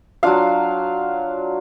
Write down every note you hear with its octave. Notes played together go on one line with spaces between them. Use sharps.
F#3 D4 F4 F5